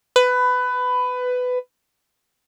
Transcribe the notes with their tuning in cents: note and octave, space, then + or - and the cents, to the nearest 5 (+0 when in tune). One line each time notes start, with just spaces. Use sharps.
B4 +15